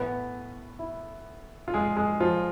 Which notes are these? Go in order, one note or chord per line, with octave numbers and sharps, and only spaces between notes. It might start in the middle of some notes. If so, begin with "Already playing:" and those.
Already playing: A2 E3 B3 B4
E4
F4
G#3 G#4
G#3 G#4
F3 F4